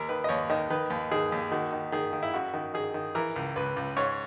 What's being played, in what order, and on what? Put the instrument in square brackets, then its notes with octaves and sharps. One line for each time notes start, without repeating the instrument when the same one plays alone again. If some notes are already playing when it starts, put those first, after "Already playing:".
Already playing: [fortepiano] D#2 A#4
D#3 B4
D#5
D#2 C#5
D#3 D#5
D#3 B4
D#2
D#3 G#4
D#2
D#3 F#4
D#3
D#3 G#4
D#3
E4
F#2 F#4
D#3
D#3 G#4
D#3
E3 A#4
C#2
C#2 B4
C#2
G#2 C#5